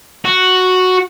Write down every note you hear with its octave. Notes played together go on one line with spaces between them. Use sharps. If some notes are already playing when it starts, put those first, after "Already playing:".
F#4